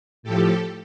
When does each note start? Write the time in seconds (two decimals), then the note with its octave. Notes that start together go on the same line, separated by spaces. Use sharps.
0.23 A2 F3 G4 A4